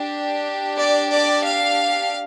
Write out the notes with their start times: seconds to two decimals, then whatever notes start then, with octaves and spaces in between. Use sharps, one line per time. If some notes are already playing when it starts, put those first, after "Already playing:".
Already playing: D4 G4
0.77 D5
1.11 D5
1.45 F5